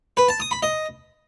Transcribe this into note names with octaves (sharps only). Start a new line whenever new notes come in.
B4
A5
D#6
B5
D#5